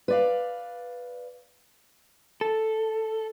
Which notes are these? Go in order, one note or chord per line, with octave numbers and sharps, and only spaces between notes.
B4 D5 F5
A4